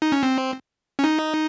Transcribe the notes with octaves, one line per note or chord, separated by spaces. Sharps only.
D#4
C#4
C4
C#4
D#4